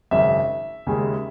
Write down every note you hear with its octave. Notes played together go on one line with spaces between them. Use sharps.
G#1 F#2 C#3 E5
D#2 C#3 G#3